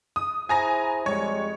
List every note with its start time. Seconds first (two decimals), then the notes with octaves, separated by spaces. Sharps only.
0.16 D#6
0.49 E4 G#4 C5 G#5 A#5 A#6
1.06 F2 G3 G#3 C#5